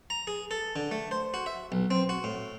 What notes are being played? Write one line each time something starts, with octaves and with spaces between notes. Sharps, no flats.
A#5
G#4
A4
D3
A3
C5
F#4
E5
B1
C4
F#4
A2